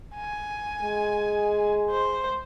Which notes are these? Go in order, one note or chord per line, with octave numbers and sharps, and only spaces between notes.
G#5
G#3
C5